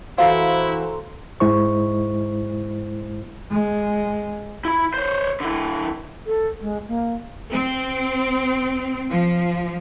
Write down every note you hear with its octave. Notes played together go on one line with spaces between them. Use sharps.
E3 E4 F#4 A4 C5 F5 A#5 C6
G#2 G#3 E4 C5 C#6
G#3
E4 B5
C5 C#5
D3 E4
A4
G#3
A#3
C4
F3